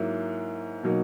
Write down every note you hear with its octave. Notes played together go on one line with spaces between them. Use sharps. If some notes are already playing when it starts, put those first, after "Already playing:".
Already playing: G#2 F#3 A#3 E4
B2 F#3 A#3 D#4